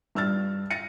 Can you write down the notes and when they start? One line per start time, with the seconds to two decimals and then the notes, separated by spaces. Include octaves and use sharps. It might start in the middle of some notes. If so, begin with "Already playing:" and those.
0.15 G2 E6 F6 A6
0.70 A6 A#6 C#7 D#7